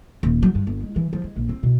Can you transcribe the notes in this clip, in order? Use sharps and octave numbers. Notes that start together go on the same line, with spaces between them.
D#1
F#3
G2
G1
G#3
E3
F3
G#3
A#1
C4
B2